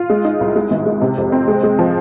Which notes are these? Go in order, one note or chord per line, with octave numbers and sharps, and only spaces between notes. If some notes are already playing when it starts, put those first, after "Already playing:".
Already playing: F4
G#3
D#4
C2
G#3
G#1
G#3
C3
F2
C4
G#3
G#3
F3